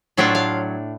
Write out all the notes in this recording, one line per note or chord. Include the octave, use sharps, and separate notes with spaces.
A2 F#3 A3 D4 F4 E5
F5